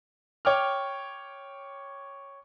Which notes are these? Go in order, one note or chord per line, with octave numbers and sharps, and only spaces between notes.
C#5 G5 D6 F6